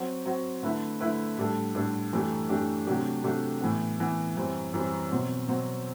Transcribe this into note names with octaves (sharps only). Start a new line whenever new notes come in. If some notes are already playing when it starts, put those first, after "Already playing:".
Already playing: F#3 C4 F#4
F#3 C4 F#4
D3 A3 E4 B4
D3 A3 E4 B4
A2 G3 D4 A4
A2 G3 D4 A4
F#2 E3 A3 D4 G4
F#2 E3 A3 D4 G4
C3 F#3 A3 D4 G4
C3 F#3 A3 D4 G4
A2 E3 B3
A2 E3 B3
F#2 E3 G3 C4
F#2 E3 G3 C4
B2 F#3 C4
B2 F#3 C4